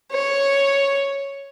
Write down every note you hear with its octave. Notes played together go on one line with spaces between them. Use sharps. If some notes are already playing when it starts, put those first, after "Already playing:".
C#5